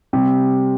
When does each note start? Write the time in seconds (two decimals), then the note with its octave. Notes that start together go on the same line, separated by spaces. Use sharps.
0.13 C3 G3 C4 G4